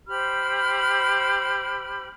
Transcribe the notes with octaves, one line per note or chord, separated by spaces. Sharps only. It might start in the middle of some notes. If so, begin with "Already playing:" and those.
G4 C5 B5 F6